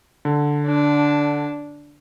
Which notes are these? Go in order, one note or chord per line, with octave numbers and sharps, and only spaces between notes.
D3
D4